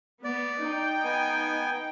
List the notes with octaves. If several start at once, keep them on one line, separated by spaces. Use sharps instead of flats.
B3 D5
D#4 G5
B3 G#5